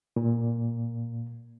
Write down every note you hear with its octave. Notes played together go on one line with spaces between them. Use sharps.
A#2